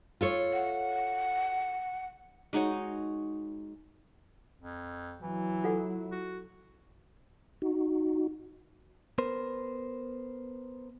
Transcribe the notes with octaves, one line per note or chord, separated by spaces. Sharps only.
F4 A4 C#5
F#5
G#3 D#4 F#4 C#5
F2
E3 F#3 E4
F4 A4 F#5
F#4
D#4 F#4
B3 A#4 C5